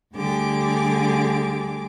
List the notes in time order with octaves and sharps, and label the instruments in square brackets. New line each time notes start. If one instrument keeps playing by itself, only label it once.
[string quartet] D2 D3 G3 G4 G#4 D6